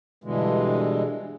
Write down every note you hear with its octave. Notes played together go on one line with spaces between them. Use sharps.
G2 B2 D3 E3 G#3